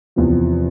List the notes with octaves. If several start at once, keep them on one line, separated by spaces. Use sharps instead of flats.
E2 C3 F3